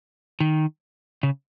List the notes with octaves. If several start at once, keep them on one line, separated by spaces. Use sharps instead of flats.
D#3
C#3